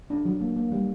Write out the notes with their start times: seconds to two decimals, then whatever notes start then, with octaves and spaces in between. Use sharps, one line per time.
0.10 D4
0.25 F#3
0.41 A#3
0.56 A#3
0.72 G3